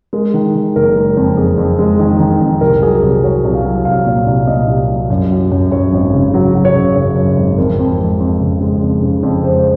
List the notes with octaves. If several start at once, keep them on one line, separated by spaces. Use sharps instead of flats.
G#3 A#4
D#3
D#3
F#1 A#4
G#3
F2
F2 G#4
F2
G#3
D#3 G#4
D#3
F2
C2 A#4
F#3 G#4
C2
F#3 C#5
C2
F5
F#3
C2 F5
A#2
C2
A#2 D#5
C2
F#3
F#2
F#3
F#2
F#2 C#5
G#1
C#3
F#3
F#3
C#5
C#3
F#2 C#5
F#2
G#1
F2 A#4
F2
G#3
F2
C#3
G#3
F2
C#3
F2
G#3 C5